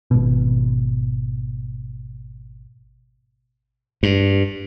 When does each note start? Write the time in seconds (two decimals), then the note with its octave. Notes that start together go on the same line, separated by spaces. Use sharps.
0.11 G#1 B2
4.03 G2